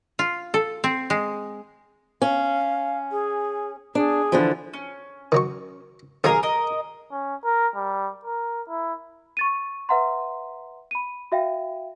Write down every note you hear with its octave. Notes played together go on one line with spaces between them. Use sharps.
F4
A4
C4
G#3
C#4 F5
G#4
D4 G#4
D3 E3 F3
C#4
D#3 F#3 C#6
B1 D#3 A#3 G#4 A#4 F5
A#4 D#5
C#4
A#4
G3
A#4
E4
C#6 A6 D#7
B4 E5 F#5 A#5 C6
B5 D#7
F#4 E5 F5 G5